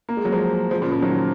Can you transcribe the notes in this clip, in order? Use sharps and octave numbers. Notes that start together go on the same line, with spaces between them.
A#3
G#3
F#3
F3 G#3
F3 G#3
A#2 C#3
C#3 F3
D#3 F#3